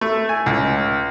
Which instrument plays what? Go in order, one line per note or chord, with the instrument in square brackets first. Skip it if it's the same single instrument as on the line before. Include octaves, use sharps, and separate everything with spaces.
[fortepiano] A3
G#5
C#2